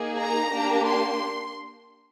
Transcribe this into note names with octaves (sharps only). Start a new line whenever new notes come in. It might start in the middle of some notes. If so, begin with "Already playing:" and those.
Already playing: A#3 D#4 G#4
A#5
A#3 D4 G4
C6